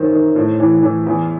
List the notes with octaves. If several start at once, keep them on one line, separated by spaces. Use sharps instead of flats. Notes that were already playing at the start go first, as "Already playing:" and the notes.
Already playing: F#2 D#3 C5
D#3
A2
E3
E3
E2